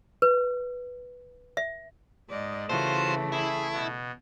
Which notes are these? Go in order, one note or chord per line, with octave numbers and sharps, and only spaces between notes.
B4
E5
G#2 D5 D#5
C#3 E3 A3 F4 F#4 C5
E4 G#4
B2